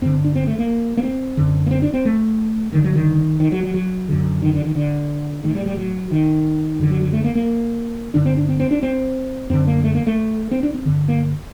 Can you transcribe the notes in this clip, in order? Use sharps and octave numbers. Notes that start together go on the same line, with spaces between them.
G2 D3 C4
D4
C4
A3
A#3
A#3
C4
F#2 D3
A#3
C4
D4
C4
A3
G2 D3 D#3
F#3
D#3
D#3
F#3
F#3
F#3
F#2 D3
D#3
D3
D#3
D3
A2 D#3
G3
G3
F#3
D#3
F#2 D3 D#3
F#3
F#3
A3
A#3
A#3
G2 D3 D4
C4
D4
C4
C4
D4
C4
F#2 D3 C4
A#3
A3
A#3
A3
C4
D4
C4
G2 D3
A#3